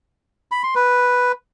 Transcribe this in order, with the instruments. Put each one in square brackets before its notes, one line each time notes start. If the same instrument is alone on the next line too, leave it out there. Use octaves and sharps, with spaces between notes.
[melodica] B5
C6
B4